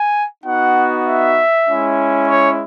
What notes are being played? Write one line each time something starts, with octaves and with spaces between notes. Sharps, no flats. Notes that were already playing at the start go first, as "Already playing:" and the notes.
Already playing: G#5
B3 D#4 F#4 F#5
E5
G#3 C#4 E4
C#5